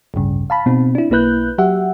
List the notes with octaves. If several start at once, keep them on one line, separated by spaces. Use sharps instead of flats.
A1 D2 G2 C#3
F5 A5 B5
B2 C4 D#4
D4 E4
B1 A#3 E4 B4 F#6 G6
F#3 G4 E5 F#5